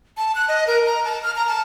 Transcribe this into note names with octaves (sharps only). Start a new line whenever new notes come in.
A5
F#6
D#5
A#4
A#5
A5
F6
A#5
A5